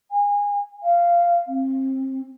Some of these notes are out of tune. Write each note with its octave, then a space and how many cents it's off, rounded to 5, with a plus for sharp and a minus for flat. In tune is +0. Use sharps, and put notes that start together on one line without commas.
G#5 -25
F5 -10
C4 +25